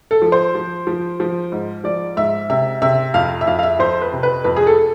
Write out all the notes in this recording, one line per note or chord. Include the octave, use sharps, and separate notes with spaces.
A4
F3
C5
F3
F3
F3
G#2
F3 D5
G#2 E5
C3 E5
C3 E5
F2 F5
E5
F2 F5
F5
E5
F2 C5
B4
C3
B4
F2 B4
G#4
A4